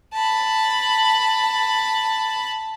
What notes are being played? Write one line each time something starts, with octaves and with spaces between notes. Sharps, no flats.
A5 B5